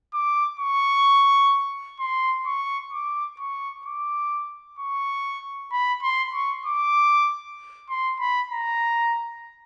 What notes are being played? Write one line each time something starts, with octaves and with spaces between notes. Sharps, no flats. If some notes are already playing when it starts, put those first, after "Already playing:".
D6
C#6
C6
C#6
D6
C#6
D6
C#6
B5
C6
C#6
D6
C6
B5
A#5